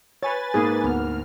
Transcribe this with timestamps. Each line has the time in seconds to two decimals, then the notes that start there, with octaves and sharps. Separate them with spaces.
0.23 B4 C#5 G#5 A6
0.54 G#2 A#3 G#4
0.84 D2 B3 F6